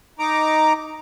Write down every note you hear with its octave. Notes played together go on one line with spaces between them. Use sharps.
D#4 A#5 D6